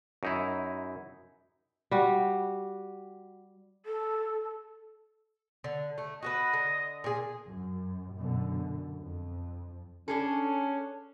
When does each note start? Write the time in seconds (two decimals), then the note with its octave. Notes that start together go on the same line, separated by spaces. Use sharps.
0.23 F#2 D#4 E4
1.91 G3 F#4
3.86 A4
5.64 D3
5.98 A3
6.23 F#4 A4 B4 D#5
6.53 D3
7.04 A#2 G#4
7.46 F#2
8.17 F#2 B2 D3
9.02 F2
10.08 C#4 D4 G#4 A4